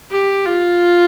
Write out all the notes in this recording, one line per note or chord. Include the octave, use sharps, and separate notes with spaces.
G4
F4